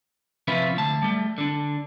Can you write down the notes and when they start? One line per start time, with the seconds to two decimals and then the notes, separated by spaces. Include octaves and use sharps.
0.48 C3 F3 C#4 E4 F4 B4
0.77 D2 A5
1.02 G3 A3
1.38 D3 D4